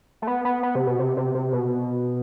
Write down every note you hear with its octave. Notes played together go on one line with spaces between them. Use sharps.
A3
B3
B3
B3
C3
B2
C3
C3
C3
B2